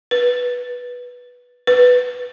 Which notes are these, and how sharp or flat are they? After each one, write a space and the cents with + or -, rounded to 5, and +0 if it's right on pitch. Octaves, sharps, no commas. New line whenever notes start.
B4 -10
B4 +5